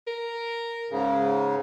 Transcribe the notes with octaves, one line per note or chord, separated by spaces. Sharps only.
A#4
G#2 C#3